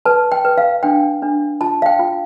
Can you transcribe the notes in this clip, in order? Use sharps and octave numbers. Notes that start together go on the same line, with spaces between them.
B4 A5
G5
B4
F5
D4 G5
D4
F4 A5
F5
G5
F4